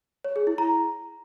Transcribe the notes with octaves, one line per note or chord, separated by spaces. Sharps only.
C#5
G#4
E4
A#5